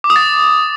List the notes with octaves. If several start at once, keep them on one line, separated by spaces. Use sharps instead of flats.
D6
D#6
A6